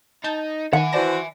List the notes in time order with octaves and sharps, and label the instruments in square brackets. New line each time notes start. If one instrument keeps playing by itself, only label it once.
[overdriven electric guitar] D#4 [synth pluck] A5 G6 A6
[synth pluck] D#3 [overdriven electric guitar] E5 G#5 [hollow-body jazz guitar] F#5
[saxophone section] E3 F#4 C5 [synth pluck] D5 A5 A#6